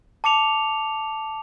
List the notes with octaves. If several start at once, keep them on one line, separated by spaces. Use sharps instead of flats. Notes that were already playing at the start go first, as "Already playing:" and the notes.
A5 D6 C#7 F7